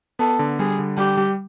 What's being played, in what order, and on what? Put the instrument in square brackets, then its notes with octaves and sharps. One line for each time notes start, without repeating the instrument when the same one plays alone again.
[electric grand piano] B3 [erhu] A4
[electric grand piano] D3
[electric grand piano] G3 [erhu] G#4
[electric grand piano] D3
[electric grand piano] G3 [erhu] G4
[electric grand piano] G3